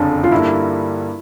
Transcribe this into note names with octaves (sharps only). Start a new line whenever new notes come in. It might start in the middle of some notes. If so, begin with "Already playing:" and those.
Already playing: F#1 F2 D3 C#4 D4
F4
G2 D3 G3 A#3 E4